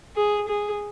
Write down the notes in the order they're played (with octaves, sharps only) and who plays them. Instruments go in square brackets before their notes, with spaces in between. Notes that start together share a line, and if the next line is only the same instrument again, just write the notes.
[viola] G#4
G#4